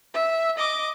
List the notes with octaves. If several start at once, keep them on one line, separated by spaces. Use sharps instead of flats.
E5
D#5 D6